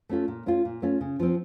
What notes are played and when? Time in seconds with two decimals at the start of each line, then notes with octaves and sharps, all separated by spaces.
0.09 A3 C#4 F4 A4
0.28 A#2
0.46 A3 C#4 F4
0.65 A#2
0.82 A3 C#4 F4
1.01 C#3
1.20 F3 C4